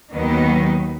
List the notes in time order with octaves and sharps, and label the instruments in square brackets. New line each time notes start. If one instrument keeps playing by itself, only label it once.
[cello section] D#2 D#3 F#3 B3 D#4